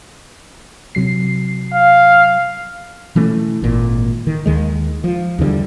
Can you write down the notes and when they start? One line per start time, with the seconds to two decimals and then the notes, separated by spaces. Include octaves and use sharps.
0.95 C3 F#3 C7
1.74 F5
3.15 B2 E3 A3 C#4
3.62 G#1 A#2
4.27 D#3
4.46 D#2 D#3 G#3
5.04 F3
5.39 E2 D3 D#3 G3